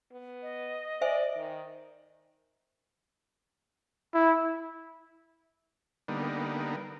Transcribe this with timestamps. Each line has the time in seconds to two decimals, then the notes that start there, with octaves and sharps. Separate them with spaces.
0.12 B3
0.42 D#5
1.01 C5 D5 E5 G#5
1.36 D#3
4.14 E4
6.08 D3 G3 A#3 B3 D#4